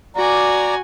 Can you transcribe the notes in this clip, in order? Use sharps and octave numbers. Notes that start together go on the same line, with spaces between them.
F#4 D5 G#5 A#5